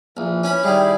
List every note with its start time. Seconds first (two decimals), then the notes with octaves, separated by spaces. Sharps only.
0.17 A#1 E3
0.44 C#4 B5
0.64 D#3 G3 E4 G4 G#4